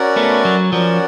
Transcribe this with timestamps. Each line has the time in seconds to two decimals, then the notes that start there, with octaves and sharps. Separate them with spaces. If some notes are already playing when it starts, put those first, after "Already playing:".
Already playing: C#4 F#4 A#4 D5 F#5
0.16 A3 B3
0.45 F#3
0.73 F3 C#4 F#4 A#4 D5 F#5